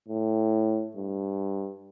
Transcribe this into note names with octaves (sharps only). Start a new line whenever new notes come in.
A2
G2